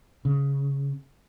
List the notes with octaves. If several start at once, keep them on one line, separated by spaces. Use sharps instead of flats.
C#3